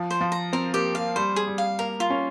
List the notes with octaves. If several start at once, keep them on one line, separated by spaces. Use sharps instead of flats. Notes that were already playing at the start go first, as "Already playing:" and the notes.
Already playing: F3
C5
F3
A#5
C4 A#4
A#3 G4
A#3 F5
G3 C5
G#4
G3
F5
A#3 A#4
F4
C#4